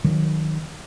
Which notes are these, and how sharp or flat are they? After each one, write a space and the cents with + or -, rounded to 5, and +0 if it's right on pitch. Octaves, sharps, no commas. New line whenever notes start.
D#3 +0 F#3 -25